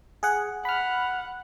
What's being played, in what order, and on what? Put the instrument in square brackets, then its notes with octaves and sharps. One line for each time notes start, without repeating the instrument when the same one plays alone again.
[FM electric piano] G#4 F#5
[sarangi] F#5 [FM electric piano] B5 F6